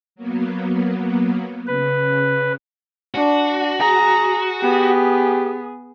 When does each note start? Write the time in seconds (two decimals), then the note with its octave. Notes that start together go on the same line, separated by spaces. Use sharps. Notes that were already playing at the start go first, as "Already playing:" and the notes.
0.16 F#3 A#3 B3
1.67 C#3 B4
3.14 D4 F#4
3.80 G#4 A#5
4.63 B3 G4 G#4